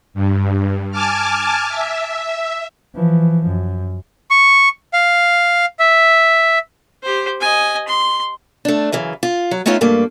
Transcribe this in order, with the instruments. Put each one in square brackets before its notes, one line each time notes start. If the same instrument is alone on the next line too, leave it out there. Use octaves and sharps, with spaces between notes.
[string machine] G2
G#5 A5 D6 F6
E5
[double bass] E3 F3
F#2
[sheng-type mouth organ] C#6
F5
E5
[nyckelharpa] G4 C5
D#5 G#5
C6
[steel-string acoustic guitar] A3 D4
F#2 C#3 E3
F4
F#3
A3 B3 C#4 D#4 F4 E5
G2 A3 A#3